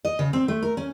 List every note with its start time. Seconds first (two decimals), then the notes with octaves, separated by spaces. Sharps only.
0.05 D#5
0.19 C#3
0.33 C4
0.48 A3
0.62 A#4
0.77 C#4